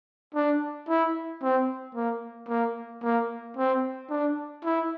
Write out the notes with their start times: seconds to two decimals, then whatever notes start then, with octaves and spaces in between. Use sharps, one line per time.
0.35 D4
0.89 E4
1.42 C4
1.95 A#3
2.49 A#3
3.03 A#3
3.57 C4
4.10 D4
4.64 E4